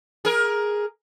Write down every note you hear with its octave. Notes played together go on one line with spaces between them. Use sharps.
G#4 A#4